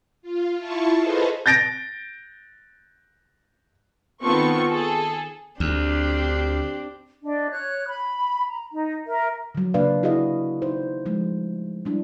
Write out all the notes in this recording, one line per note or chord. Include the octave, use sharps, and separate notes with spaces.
F4
E4 F4 A5 C#6
G#4 A4 B4 C5 D#5 F5
G6 A6 A#6 D7
D#3 B3 C4 F4 A4 C#6
G#4 A4
D2 C4 D4 G4
D4 D#5
C#5 F#6
B5
A#5
D#4
A#4 E5
D3 F#3
C#3 A#3 D4 B4 D5 F5
E4 F#4 G#4 D#5 F5
D#4 C5
F3 G#3 A3
G3 D4 E4